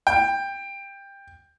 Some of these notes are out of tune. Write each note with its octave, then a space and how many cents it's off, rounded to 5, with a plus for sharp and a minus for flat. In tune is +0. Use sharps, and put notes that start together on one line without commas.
G5 +15